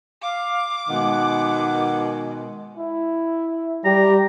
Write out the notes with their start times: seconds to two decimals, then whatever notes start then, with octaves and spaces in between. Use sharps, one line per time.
0.22 F5 D6
0.89 B2 D#3 G#3 F#5
2.77 E4
3.85 G3 G4 A#5